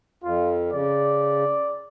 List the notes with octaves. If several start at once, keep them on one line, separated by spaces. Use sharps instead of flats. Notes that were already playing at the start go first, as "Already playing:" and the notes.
F2 F4
C#3 D5